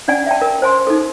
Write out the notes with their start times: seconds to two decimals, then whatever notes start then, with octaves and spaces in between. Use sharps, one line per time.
0.08 C#4 D4 D5 F#5 G#5
0.26 E5 G5 A5
0.42 A#4
0.62 C5 G#5 C6
0.87 D#4 A4